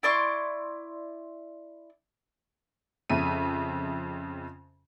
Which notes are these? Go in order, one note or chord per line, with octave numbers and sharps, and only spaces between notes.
E4 D5 C6 C#6
F2 C#3 E5 D#7